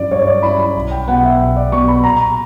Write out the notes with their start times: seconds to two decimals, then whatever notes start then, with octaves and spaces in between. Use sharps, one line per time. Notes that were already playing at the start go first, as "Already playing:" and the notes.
Already playing: G2 F#3 C#4 E4 D5
0.11 G2 C#5
0.22 C#5
0.27 D5
0.43 F#3 C#4 E4 B5
0.59 B5
0.75 B1 B5
0.91 G5
1.07 B2 F#3 B3 F#5
1.24 E5
1.39 B1
1.57 D5
1.72 B2 F#3 B3 C#6
1.88 B5
2.04 A#2 A#5